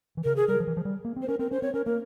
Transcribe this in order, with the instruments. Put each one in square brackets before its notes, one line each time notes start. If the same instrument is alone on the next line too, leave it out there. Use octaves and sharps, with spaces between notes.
[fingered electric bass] E3
[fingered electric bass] C#3 [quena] A#4
[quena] G#4
[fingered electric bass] G3 [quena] A#4
[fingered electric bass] F3
E3
F3
G3
A#3
C4
[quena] C5
[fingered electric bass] C#4 [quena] A#4
[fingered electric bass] C4 [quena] A#4
[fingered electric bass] C#4 [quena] C5
[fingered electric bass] C4 [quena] C#5
[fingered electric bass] C#4 [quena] A#4
[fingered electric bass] A#3 [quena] A#4